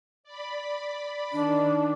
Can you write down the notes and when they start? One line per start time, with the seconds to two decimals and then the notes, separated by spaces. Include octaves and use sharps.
0.24 D5 B5
1.33 D#3 D4